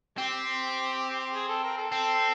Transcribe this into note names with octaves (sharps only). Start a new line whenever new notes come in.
C4 G4
G#4
A4
A#4
A4
C4